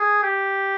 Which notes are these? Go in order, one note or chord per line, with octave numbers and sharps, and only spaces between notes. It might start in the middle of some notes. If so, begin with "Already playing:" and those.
Already playing: G#4
G4